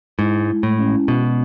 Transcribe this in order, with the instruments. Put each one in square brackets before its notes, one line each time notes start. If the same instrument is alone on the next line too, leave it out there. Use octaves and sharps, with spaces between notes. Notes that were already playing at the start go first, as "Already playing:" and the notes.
[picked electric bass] G#2 [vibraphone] E4
[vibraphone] G#3
E4
[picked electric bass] A2 [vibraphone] G#3
[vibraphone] C#4
G#3
[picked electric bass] B2 [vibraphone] B3
[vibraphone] F#4